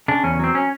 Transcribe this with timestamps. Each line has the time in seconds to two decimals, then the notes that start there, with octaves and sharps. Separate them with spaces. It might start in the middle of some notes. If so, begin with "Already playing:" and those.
0.08 C#3 D4
0.24 E2 C#4
0.39 F#3 C4
0.55 C#4